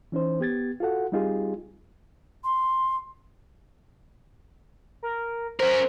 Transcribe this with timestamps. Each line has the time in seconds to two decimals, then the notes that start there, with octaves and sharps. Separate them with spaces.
0.12 E3 C#4 D#4 C5
0.40 B3 G4 G#6 A6
0.80 F4 F#4 A4 F#5
1.12 G3 C4 D#4 F4 G4 G#4
2.44 C6
5.03 A#4
5.60 C#4 A#4 C5 B6